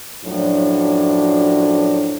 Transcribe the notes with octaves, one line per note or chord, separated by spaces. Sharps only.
F#2 A2 F3 F#3 D4